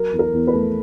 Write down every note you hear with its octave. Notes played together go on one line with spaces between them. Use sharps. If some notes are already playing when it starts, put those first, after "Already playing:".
Already playing: F#3 A#4
E2
A#4
E2
B4
A3